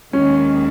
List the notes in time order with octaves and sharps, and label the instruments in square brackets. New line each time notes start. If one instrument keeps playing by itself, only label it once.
[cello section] D#2 D#3 G#3 [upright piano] C#4